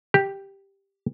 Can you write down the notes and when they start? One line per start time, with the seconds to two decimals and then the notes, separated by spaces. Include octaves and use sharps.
0.14 G4